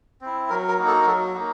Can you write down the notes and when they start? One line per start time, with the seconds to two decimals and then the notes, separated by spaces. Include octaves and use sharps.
0.21 C4 E4
0.50 F#3 A#4
0.68 A#4
0.78 A#3 D#4 F#4
0.86 A4
1.02 A#4
1.06 F#3 A4
1.34 A#3 D#4 F#4